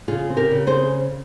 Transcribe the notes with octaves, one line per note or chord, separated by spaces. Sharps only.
C#3 F4 G#4
C4
G4 A#4
C#3
G#4 C5